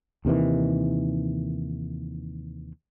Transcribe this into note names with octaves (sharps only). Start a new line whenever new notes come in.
D#2 C3 D#3 E3